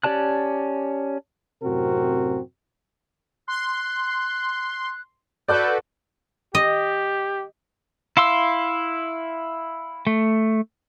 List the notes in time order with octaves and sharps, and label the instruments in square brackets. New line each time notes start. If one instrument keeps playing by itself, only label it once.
[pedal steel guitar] C#4 G4 D5 A5 F#6
[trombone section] F#2 A2 C3 C4 F#4 A#4
[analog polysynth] C6 [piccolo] F#6
[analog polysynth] F#4 A4 B4 [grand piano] D5 D6 F#6 [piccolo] G6
[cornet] G4 [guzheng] D#5
[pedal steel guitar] E4 F5 C6 E6
A3